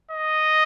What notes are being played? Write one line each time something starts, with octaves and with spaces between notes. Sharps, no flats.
D#5